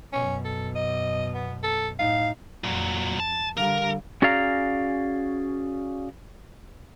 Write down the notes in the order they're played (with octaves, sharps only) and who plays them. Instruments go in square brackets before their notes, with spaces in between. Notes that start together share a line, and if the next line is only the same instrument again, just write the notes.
[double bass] F#2 B2 [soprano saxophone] C#4
[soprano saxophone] A4
D#5
B3
A4
[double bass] A2 D#4 [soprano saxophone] F5
[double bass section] F2 [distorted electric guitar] A#2 F#3
[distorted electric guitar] A5
[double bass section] D3 G3 [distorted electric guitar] A#4 [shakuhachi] F5
[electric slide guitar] C#4 F#4 G#4 D5 F5 A#5